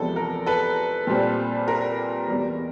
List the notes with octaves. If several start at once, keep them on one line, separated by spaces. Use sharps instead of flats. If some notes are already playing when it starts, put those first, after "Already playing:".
Already playing: E2 C3 F3 G#3 B3 A4
A#4
A4 B4
A#2 G3 C4
A#4
E2 B2 G3